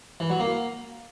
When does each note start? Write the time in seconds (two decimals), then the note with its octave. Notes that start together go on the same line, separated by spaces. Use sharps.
0.20 E3
0.30 F#3
0.40 A#3